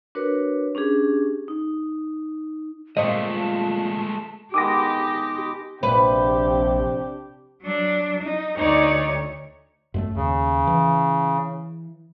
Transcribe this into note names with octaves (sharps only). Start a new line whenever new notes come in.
D4 F#4 A#4 B4 C#5
C#4 D4 G4 G#4
D#4
A#2 G#3 A3 C4 D#5 A5
D#3 G#3 B3 G4 D6 D#6 A#6
A#1 C3 C4 D4 G4 B4
F#3 D4
D#4
D2 D#4 C#5 D5
F#2 G#3 A3
D#2 C#3
E3